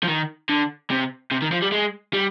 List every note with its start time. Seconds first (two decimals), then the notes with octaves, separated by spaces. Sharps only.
0.03 F3
0.08 D#3
0.49 D3
0.91 C3
1.32 C3
1.42 D#3
1.52 F3
1.62 G3
1.72 G#3
2.13 G3